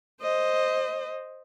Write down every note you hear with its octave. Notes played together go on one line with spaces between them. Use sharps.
C5 D#5